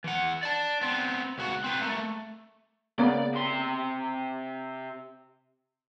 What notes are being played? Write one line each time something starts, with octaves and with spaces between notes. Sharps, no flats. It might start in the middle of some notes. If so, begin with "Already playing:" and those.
E3 F#5
D5 A5
B3 C4
C#2 F#4
C4 B4
A3 A#3
C#3 A#3 B3 D5
C3 C6